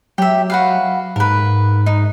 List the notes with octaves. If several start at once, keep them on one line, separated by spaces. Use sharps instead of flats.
F#3 G4 E5
F#4 B4 F5
G#2 A#4 B4
D#4